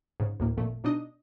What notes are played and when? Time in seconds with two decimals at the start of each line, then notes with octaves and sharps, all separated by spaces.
0.20 G#2 C#3
0.40 D2 A2 A#3
0.57 G#1 F2 A#2 A3
0.84 B2 D4 D#4 D#5